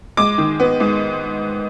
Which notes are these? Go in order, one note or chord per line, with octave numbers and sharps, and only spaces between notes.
G#3 D6
D#3
B3
G#2